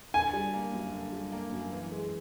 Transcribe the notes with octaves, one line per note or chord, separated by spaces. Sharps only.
D3 G#5
G3
A#3
F#2
D3
G3
A#3
F#2
E3
G#3